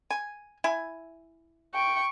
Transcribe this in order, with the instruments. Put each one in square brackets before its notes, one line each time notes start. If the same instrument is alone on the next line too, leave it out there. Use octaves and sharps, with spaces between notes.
[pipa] G#5
E4 G#5
[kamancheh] G5 C#6